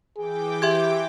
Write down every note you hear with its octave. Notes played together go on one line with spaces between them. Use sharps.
E3 G#4 G5 D6
G4 E5 C6 G#6